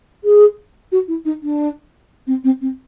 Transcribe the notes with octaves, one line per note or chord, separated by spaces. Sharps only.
G#4
F#4
E4
D#4
D4
C4
C4
C4